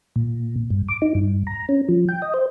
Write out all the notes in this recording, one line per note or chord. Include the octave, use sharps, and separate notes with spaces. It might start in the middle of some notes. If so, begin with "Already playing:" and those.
A#2
G2
D6
D#4
G2
A#5
C#4
F3
G5
D#5
C5